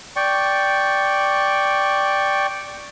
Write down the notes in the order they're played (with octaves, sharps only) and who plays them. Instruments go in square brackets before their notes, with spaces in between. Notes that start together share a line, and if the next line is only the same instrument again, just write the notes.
[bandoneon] D5 G5 C#6